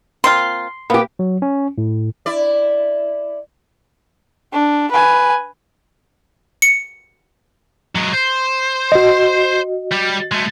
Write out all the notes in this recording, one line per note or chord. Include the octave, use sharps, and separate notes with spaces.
A#3 C4 F4 C6
A#3 B3 G4
F#3
C#4
A2
E4 D5
D4
B4 G#5
C#7
F#3 G#3
C5
F#4 D#5
G3 G4
G#3 A3